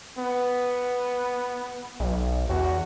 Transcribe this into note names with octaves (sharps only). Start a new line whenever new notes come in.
B3
B1
E2 F#4